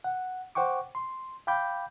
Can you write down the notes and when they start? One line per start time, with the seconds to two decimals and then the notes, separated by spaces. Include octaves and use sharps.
0.04 F#5
0.55 C5 F#5 G5 C#6 D6
0.95 C6
1.47 F5 G5 B5 D6 G6